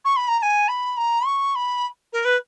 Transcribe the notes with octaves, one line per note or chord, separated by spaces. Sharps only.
C#6
B5
A#5
A#5
G#5
B5
A#5
C#6
B5
A#4
B4